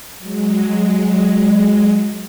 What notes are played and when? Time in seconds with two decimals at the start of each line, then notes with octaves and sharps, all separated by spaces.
0.18 F#3 G#3